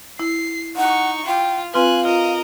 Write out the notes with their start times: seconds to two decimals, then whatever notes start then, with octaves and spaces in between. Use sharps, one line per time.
0.20 E4 C7
0.76 D#4 F#5 C#6
1.26 F4 G5
1.74 C4 F4 B4 F5 G#5 F#6
2.05 F4 A#4 D#5